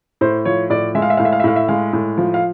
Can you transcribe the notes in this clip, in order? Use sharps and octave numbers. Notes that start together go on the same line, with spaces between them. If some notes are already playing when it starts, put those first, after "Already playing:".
A2 C5
F3 C#5
A2 D5
G#3 E5
F5
E5
A2 F5
E5
F5
E5
A2 F5
E5
G#3 F5
A2
F3
F5